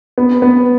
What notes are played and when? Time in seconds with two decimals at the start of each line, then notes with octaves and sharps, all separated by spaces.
0.18 B3
0.42 B3